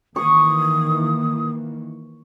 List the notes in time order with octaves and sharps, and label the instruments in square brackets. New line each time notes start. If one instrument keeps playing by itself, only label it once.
[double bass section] D#3 E3 A#3 [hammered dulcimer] C#6 [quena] D#6